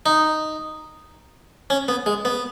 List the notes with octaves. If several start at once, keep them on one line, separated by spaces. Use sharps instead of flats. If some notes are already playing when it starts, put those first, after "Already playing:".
D#4
C#4
B3
G#3
B3